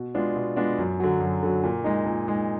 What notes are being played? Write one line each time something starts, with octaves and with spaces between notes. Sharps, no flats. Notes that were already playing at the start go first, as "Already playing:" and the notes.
Already playing: B2
G#3 B3 D4 F4
B2
G#3 B3 D4 F4
F#2
D3 F#3
F#2
D3 F#3
A#2
G#3 D#4
A#2
G#3 D#4